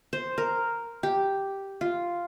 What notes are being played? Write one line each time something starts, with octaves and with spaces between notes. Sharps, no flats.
C5
A#4
G4
F4